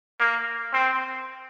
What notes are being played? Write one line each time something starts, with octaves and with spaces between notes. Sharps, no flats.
A#3
C4